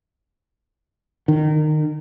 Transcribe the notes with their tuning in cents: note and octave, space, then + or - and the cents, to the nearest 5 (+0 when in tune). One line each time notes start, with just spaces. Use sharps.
D#3 -25